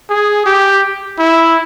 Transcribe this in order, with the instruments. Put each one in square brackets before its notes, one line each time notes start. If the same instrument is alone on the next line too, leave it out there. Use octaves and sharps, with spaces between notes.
[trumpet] G#4
G4
E4